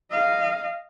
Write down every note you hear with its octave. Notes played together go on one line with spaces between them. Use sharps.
D#5 F5